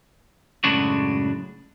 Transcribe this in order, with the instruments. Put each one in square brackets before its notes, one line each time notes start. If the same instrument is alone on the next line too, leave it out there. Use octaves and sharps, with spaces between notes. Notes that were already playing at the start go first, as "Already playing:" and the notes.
[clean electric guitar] F#2 A2 C#3 G#3 D4 F#4